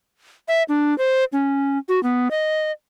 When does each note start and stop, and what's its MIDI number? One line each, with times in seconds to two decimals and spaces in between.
0.48 0.63 76
0.69 0.96 62
0.98 1.24 72
1.33 1.78 61
1.89 2.02 66
2.03 2.28 59
2.31 2.71 75